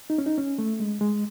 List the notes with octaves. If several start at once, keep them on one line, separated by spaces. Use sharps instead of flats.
D#4
C#4
D#4
C#4
A3
G#3
G#3